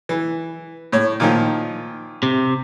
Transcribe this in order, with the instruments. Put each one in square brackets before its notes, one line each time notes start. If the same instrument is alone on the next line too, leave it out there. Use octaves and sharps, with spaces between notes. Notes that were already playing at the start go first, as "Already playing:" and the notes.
[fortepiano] E3
A2 C#5
A#2 D#3 F3
[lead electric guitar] C3